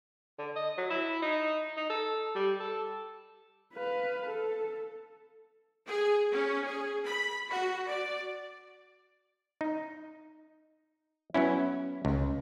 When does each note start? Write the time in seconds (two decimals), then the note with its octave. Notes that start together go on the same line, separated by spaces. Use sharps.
0.38 D3
0.56 D#5
0.77 F#3
0.90 E4
1.22 D#4
1.77 D#4
1.90 A4
2.35 G3
2.60 A4
3.74 B4 F5
4.26 A4
5.87 G#4
6.33 C#4
6.66 G#4
7.07 B5
7.49 F#4
7.88 D5
9.61 D#4
11.34 F#3 B3 C#4 E4
12.05 C#2